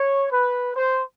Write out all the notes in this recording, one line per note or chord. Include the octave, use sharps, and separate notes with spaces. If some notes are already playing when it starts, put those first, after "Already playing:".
Already playing: C#5
B4
C5